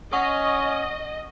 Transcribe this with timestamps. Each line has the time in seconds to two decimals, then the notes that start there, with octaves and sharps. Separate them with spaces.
0.13 C#4 D#5 F#5 C#6 D#6